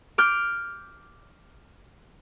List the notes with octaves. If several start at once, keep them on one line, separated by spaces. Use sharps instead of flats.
D6 F6 G6